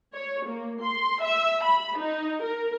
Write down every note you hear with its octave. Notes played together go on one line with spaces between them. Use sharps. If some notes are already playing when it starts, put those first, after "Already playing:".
C#5
A#3
C6
E5
B5
D#4
A#4